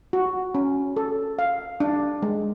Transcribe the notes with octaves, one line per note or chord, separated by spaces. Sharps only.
F#4
C#4
A4
F5
D4
G#3